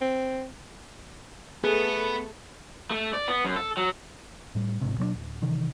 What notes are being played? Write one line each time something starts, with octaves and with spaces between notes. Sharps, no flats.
C4
A3 B3 G#4 A4 B4
A3
D5
B3
F#2
A4
F#3
A2 G3
A1 G#2 C3
B2 F#3 A3 D4
D1
C3 D#3 E3